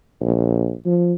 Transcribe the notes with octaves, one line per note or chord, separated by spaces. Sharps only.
A#1
F3